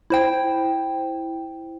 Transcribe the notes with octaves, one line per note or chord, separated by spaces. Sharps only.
E4 C5 G5